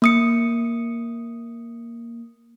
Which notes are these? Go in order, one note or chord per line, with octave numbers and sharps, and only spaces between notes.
A#3 D#6 C#7